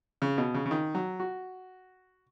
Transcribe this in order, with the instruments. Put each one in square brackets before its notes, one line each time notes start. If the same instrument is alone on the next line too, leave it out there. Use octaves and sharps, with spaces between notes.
[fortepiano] C#3
B2
C#3
C#3
D#3
F#3
F#4